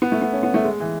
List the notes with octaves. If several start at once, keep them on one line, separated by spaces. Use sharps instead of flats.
B3
A3
B3
C#4
B3
A3
G#3
E3